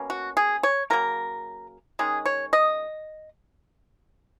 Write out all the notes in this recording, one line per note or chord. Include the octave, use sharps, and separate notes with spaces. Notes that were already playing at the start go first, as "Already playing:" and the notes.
Already playing: B2 A#3 C#4
F#4
G#4
C#5
C#3 F#3 A#3 A#4
D#3 G#3 C#4 G#4
C#5
D#5